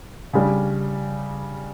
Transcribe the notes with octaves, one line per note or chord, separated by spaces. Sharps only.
C#3 G3 D4